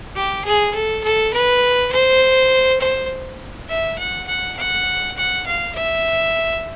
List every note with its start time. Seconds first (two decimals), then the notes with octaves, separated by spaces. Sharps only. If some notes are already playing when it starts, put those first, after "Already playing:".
0.16 G4
0.45 G#4
0.74 A4
1.04 A4
1.34 B4
1.92 C5
2.81 C5
3.69 E5
3.99 F#5
4.28 F#5
4.57 F#5
5.17 F#5
5.47 F5
5.75 E5